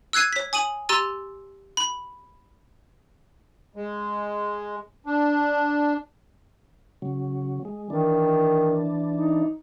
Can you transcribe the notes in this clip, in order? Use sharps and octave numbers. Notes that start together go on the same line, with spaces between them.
E6 F#6 G#6 C7 D#7
C#5 B6
G#5 D#6 D#7 F#7
G4 A#5 C6 E6 A6 D#7
B5
G#3
D4
C#3 F#3
G#3
D#3 E3 D4
D#4